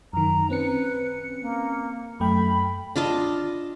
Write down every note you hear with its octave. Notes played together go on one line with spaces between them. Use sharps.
F#2 D#3 A#5
C4 C#4 B4 C#7
A#3
F#2 A3 G5 B5
D4 F4 D#5 A5